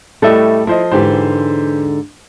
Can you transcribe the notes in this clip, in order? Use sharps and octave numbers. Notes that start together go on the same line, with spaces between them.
A2 G3 A3 A4 D#5 E5
F3 E4 C5 D#5
G#2 D3 E3 G4 C5